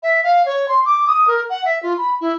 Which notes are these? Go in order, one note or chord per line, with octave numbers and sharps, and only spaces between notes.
E5
F5
C#5
C6
D6
D#6
A#4
F#5
E5
F4
B5
E4